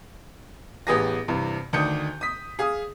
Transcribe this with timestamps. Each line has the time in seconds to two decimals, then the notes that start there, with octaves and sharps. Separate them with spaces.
0.87 A1 B3 G4 G#4 D#6 A#6
1.28 G2 C3 E3
1.73 D2 D#3 D4 D#6 G6 C#7
2.21 D#6 B6
2.59 G#4 F5 D#6